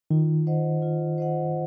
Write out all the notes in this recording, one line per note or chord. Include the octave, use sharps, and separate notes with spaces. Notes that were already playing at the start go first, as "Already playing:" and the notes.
D#3 F4
C5 D#5 F#5
F4
C5 D#5 F#5